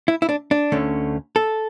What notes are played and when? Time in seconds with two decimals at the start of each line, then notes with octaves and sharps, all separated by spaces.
0.08 E4
0.22 E4
0.29 D4
0.51 D4
0.72 D2 D3 A3 C#4
1.36 A4